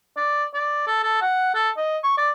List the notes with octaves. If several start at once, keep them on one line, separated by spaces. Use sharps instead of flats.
D5
D5
A4
A4
F#5
A4
D#5
C#6
D5